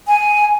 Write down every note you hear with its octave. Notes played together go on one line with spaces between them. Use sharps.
G#5